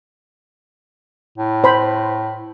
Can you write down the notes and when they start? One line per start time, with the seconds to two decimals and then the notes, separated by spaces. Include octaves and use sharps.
1.38 A2
1.64 C5 B5